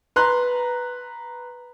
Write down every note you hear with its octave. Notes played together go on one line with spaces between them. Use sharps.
B4 A#5 C6 F#6